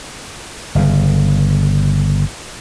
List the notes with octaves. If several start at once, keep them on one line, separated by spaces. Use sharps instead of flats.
G1 C#3